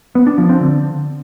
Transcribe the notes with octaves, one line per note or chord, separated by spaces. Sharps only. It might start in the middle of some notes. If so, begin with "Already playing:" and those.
B3
D4
F3
C4
D3